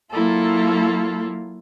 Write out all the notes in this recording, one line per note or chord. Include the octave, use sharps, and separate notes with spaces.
F#3 A#3 E4 F4 A4